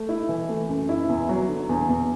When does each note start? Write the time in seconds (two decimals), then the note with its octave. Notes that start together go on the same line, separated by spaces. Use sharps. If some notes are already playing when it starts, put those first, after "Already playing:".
Already playing: A3
0.09 E4
0.29 E3
0.49 A3
0.69 F#2
0.89 E4
1.09 E2
1.29 F#3
1.49 D3
1.69 E2
1.89 E2